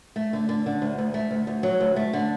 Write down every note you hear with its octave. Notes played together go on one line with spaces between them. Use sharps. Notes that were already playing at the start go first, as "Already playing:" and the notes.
A3
D3
D3
D3
D2
D2
A3
D2
D2
F#3
D2
A3
D3